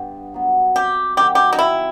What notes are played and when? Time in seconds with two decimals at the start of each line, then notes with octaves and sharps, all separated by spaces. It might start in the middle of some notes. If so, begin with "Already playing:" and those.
Already playing: G2 B3
0.34 F#3 B3
0.75 C3 G4
1.17 D#3 F#3 C4 G4
1.35 G4
1.53 D#4
1.58 C3 E4